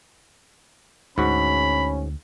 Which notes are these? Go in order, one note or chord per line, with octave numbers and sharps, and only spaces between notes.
D2 G#2 C#4 F#4 B5